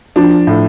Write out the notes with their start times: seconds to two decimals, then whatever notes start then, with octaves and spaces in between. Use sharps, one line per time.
0.16 F3 D4
0.47 A2